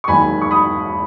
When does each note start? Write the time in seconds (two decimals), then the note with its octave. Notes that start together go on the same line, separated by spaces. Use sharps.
0.04 C#6
0.08 E1 D#2 D#3 F#3 G#5 B5
0.42 C#6
0.51 B5 D#6